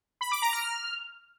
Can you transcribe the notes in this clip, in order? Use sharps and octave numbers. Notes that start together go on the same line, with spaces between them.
B5
D6
A#5
F6